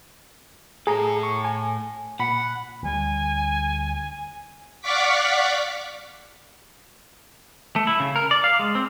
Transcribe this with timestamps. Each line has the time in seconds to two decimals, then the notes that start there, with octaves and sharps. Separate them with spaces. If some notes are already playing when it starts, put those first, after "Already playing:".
0.87 A2 G#4 A4 A#5
1.23 C#6
1.45 G#5
2.19 A#2 F#5 B5
2.83 D2 G3 G#5
4.81 D5 F5 F#5 C#6 D6 B6
7.76 A3
7.87 E4
8.00 C#3
8.16 A#4
8.31 D5
8.44 F5
8.59 G#3
8.75 C4